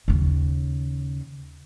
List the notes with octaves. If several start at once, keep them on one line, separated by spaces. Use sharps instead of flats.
D#2 C#3